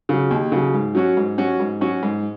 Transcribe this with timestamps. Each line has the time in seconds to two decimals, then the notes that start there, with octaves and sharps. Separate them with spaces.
0.09 C#3 F#3
0.31 D#2
0.52 C#3 F#3
0.74 G#2
0.95 F#3 C#4 F#4
1.17 G#2
1.38 F#3 C#4 F#4
1.60 G#2
1.81 F#3 C#4 F#4
2.03 G#2